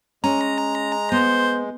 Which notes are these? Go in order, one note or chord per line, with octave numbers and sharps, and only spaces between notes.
G#3 C#4 A#5
B3 C5